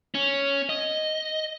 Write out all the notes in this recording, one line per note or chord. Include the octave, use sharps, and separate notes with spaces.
C#4
D#5